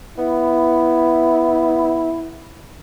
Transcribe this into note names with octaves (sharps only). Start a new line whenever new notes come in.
B3 E4